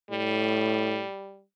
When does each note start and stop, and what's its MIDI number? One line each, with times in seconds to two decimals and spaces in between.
0.11 1.05 45
0.11 1.42 55